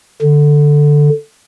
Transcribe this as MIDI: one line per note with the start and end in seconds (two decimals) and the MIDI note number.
0.22 1.09 50